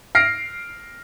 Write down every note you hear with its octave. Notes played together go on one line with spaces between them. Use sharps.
F6 A#6 C7 D7